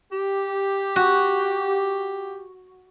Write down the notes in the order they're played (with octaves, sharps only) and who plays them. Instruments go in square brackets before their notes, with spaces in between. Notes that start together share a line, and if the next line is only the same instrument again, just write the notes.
[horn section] G4
[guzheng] F#4